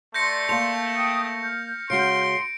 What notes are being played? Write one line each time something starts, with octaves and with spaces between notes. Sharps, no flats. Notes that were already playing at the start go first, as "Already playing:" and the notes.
A3 D5 C6 G6 A#6 C#7
A#3 A5 F7
G5 D#6
F6 G6
C#3 G#3 F#4 C6 D7